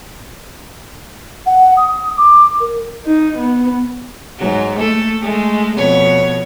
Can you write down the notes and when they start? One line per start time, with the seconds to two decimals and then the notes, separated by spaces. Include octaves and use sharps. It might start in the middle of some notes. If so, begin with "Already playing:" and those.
1.46 F#5
1.77 D#6
2.18 D6
2.60 A#4
3.07 D#4
3.38 B3
4.38 G#2 F#3
4.79 A3 A#3 A4
5.22 G#3 A3
5.77 F2 B2 C#5